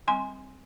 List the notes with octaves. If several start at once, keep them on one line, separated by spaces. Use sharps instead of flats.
G3 C4 G#5 C6